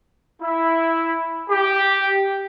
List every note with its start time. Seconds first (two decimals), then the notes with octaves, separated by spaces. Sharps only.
0.42 E4
1.50 G4